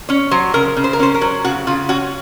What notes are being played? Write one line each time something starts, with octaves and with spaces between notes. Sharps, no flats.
C#4 C#5
F#3 C5
C#3 A#4
C#3
C5
A#4
C#4 C5
A#4
F#3
C#3 F#4
C#3 F4
C#4 F#4